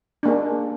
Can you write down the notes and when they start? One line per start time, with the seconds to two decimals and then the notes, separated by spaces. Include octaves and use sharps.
0.23 D4
0.26 A#3
0.28 G#4